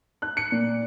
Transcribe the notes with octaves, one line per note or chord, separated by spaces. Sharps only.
F#6
C#7
A#2